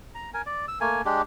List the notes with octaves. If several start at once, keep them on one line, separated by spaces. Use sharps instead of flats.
A#5
A#4 G#5
D5
E6
A3 A#3 G#5
G#3 D4 G4